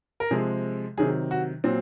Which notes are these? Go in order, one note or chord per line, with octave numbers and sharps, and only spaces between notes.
A#4
C3 F3 G#3 G#4
C3 D#3 F#3 G#4
F#4
A#2 F#3 C4